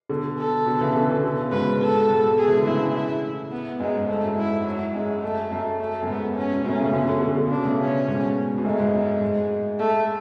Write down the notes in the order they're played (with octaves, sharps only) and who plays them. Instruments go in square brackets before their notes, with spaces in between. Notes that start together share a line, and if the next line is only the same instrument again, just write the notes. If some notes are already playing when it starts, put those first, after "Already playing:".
[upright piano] B2 D3
[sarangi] A4
[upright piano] B2 D3
C#3 E3
B2 D3
B2 D3
C#3
[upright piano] G#2 B2 [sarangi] B4
[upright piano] G#2
[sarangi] A4
[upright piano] G#2 B2
[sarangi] G#4
[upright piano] E3
D3
[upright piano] A2 C#3 [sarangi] E4
[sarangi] E4
B3
[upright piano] F#2 [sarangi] G#3
[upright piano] G#2
[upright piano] G#2 [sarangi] A3
[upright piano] F#2
[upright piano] G#2 [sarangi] E4
[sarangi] F#3
[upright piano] F#2 [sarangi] G#3
[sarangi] A3
[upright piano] F#2
[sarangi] A3
[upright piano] F#2
[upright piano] G#2 [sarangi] B3
[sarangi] C#4
[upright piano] B2
[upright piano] F#2 A2 [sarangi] C#4
[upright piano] A2 C#3
B2 D3
B2 D3
B2 D3
D3
[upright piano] C#3 [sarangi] D4
[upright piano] B2
A2 C#3
[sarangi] C#4
[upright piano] G#2 B2
B2
[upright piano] F#2 A2 [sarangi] G#3
[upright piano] G#2
F#2
G#2
[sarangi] A3